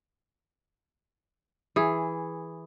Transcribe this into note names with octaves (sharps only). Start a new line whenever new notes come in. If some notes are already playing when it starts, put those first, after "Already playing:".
E3 G#4